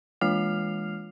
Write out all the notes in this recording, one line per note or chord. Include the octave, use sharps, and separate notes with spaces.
E3 G#3 F4 F6 C7 F7